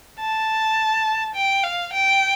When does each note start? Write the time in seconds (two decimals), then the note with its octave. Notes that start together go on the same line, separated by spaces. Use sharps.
0.20 A5
1.35 G5
1.63 F5
1.93 G5